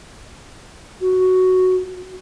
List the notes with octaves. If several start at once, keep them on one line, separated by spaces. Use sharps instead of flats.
F#4